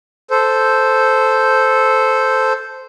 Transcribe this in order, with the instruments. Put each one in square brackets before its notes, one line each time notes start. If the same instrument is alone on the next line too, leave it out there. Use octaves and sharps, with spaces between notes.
[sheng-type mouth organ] A4 C5